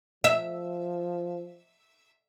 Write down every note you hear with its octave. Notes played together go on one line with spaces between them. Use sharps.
F3 E5